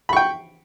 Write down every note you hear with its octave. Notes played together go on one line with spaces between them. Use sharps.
G5 B5 C#6